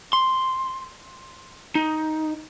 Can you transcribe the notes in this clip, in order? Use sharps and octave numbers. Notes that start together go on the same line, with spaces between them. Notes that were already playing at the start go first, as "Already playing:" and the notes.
C6
D#4